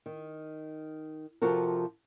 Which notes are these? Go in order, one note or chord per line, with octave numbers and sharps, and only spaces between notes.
D#3
C3 F3 F4 F#4 A4 A#4